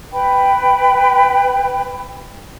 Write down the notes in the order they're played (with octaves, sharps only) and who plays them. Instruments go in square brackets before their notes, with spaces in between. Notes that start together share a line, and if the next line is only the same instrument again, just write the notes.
[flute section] B4 G5 B5